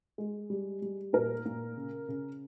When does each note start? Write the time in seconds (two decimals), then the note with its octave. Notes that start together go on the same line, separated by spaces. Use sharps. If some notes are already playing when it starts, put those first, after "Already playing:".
0.18 G#3
0.50 G3
0.82 G3
1.13 A#2 A#4
1.45 A#2
1.77 C#3
2.08 C#3